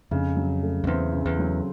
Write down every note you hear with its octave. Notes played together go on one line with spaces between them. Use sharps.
F2 C#3
F#3
A3
F2
E2 C4
C#3
E2
F#3